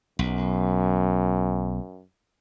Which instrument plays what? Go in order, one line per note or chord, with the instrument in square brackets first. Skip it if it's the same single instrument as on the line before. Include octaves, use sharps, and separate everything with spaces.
[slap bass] B1 [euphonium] F#2